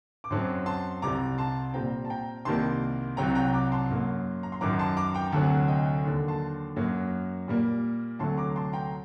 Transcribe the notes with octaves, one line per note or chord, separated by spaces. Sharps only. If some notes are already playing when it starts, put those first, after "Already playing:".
D6
F#2 F#3 C4 A5 C6
A5 C6
C2 C3 G3 A#5 D6
A5 C6
A#2 G3 C4 G5 A#5
A5
G5 A#5
C2 C3 D#3 G3 A#3 A5 C6
C2 C3 F#3 G5 A#5
G5 A#5
A#5 D6
A5 C6
F#2 F#3 A#3
A#5
C6
F#2 D#3 F#3 A#5 D6
A5 C6
A#5 D6
G5 A#5
D2 C3 F#3 F#5 A5
D#5 G5
D#2 D3 F#3
A5 C6
F#2 F#3 A#3
A#2 G3 A#3
D2 C3 F#3 A3 A5 C6
A#5 D6
A5 C6
G5 A#5